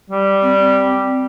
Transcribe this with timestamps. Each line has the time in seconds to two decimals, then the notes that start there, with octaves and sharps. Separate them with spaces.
0.10 G3
0.42 C4